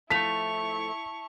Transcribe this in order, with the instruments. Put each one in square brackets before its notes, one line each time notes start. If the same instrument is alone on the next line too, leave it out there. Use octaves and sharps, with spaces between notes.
[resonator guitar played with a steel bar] A2 F3 A3 [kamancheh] E4 C#6 [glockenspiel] A5 F7 [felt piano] B6